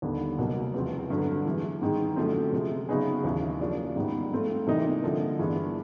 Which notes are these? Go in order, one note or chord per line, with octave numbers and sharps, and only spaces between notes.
D#2 D3 G3 B3
C2 B2 F#3 A#3
E2 C#3 F3 G#3 C4
G2 D3 F#3
G2 E3 G#3
G#2 D#3 G#3
F#2 D3 F3 A3 C4
C3 F3 G#3
C#3 F#3 B3 D#4 G#4
D#2 C#3 E3
F#2 C#3 F3 A#3 D4
G#2 D#3 G3 B3
G#2 F3 A3 C4 F4
C3 E3 G3 A#3 D#4
D3 F3 A#3
G2 E3 G#3 B3 D4